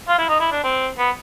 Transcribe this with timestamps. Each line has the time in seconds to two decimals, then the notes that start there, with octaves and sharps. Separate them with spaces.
0.08 F4
0.18 E4
0.29 D#4
0.40 E4
0.52 D4
0.64 C4
0.98 B3